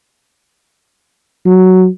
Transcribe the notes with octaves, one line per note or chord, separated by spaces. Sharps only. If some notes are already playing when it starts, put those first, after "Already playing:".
F#3